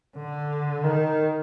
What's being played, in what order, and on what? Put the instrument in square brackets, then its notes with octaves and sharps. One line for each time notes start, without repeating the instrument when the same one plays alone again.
[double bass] D3
D#3